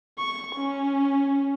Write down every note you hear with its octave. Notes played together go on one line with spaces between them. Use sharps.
C#6
C#4